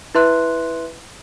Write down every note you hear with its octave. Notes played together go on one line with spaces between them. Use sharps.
E4 B4 E5 C6 F#6